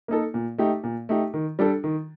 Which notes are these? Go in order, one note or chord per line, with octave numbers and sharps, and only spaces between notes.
A#3 D#4 A4
A#2
A3 D#4 G4
A#2
A3 D#4 G4
D#3
G3 D4 A4
D#3